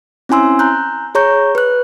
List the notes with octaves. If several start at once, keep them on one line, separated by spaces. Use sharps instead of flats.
C4 C#4 E4 G#5 C6 E6
A#5 F#6 G6
G#4 C#5 A#5 C#6 G6
B4 F#6